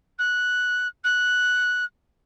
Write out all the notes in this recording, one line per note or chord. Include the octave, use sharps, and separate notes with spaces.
F#6
F#6